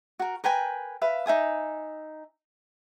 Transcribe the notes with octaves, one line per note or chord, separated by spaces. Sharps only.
F#4 A#4
A#4 B4 G5 G#5
B4 E5 F5
D#4 E5 G#5 D#6